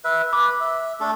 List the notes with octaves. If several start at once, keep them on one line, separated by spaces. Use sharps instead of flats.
B4 E5
B4 B5 D6
E5
A3 D4 A4